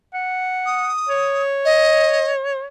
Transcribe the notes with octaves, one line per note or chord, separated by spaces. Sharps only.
F#5
D#6
C#5
D#5